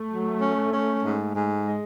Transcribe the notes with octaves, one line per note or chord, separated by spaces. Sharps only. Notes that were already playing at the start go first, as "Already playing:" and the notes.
Already playing: A3
F#3
C#4
C#4
G#2
G#2
G#3